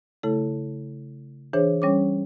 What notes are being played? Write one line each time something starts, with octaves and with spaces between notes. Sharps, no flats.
C#3 A3 E4 A4
E3 D4 G#4 C5 C#5
G3 C#4 C#5 D6